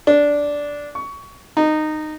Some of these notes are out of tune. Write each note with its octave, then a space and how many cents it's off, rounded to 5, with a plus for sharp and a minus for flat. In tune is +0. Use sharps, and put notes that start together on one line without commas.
D4 -10
C#6 +20
D#4 -15